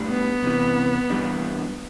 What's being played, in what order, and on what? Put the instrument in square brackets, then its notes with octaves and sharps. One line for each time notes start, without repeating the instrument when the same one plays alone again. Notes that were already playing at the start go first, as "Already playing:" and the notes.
Already playing: [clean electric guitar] A2 G3 D4
[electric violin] B3
[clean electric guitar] C2 C3 E3
G2 E3 G3 D4